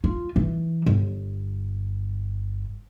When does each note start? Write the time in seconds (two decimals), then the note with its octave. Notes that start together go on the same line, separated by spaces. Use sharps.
0.04 F4
0.36 E3
0.86 G1